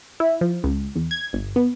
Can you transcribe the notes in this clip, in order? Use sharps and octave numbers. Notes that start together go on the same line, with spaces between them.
E4
F3
C#2
E2
G#6
G1
B3